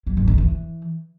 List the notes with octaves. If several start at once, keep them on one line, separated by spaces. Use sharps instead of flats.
F#3
G#2
D#3
E3